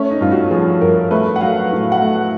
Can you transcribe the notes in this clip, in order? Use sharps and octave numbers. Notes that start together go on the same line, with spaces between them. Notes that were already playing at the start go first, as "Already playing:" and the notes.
Already playing: A3 C#4
D#4
G2 F4
F#4
F3 G#4
G2 A#4
A3 B4
F#5
F#3 F5
A2
F#5
A3